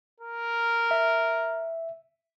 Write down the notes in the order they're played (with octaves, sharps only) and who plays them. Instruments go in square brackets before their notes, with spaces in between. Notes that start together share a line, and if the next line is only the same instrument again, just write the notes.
[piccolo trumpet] A#4
[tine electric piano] E5